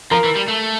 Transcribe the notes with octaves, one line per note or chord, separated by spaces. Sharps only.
F3 A#4 A#5
E3
G3
A3